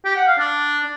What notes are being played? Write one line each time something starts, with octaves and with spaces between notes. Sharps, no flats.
G4
F#5
F5
D4